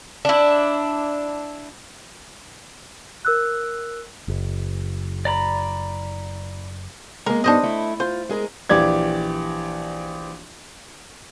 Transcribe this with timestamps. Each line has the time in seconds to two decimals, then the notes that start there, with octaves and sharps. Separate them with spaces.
0.25 D4 E4
3.25 A#4 E6 F#6
4.28 F#1
5.25 D5 A#5 B5
7.26 G#3 A#3 A#4
7.44 G2 B3 D4 D#4 C5 D#5
7.63 A3 E4
8.00 F4 C5
8.29 G#3 G#4 A#4
8.69 A#1 E3 G4 D5 G#6